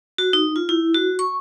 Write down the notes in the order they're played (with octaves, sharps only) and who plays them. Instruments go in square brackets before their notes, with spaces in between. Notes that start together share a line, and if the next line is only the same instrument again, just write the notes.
[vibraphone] F#4
D#4
F4
E4
F#4
C#6